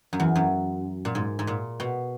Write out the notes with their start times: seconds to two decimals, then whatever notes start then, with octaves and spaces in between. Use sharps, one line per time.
0.13 F#2
0.20 E2
0.35 F#2
1.05 A#2
1.15 G#2
1.39 G#2
1.47 A#2
1.80 B2